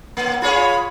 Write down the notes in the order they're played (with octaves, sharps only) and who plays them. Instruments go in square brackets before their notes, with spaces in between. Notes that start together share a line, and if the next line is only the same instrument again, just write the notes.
[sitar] A#3
[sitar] F4 G#4 C#5 [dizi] B5